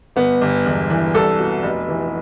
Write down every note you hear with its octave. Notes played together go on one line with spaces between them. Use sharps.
G1 B3
G1
E1
E3
C2 A4
B2
F1
E3